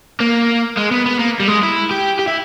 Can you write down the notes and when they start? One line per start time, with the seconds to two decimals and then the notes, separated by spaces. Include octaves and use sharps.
0.20 A#3
0.77 G#3
0.91 B3
1.06 B3
1.19 A#3
1.40 G3
1.48 G#3
1.63 E4
1.91 G4
2.19 G4
2.28 E4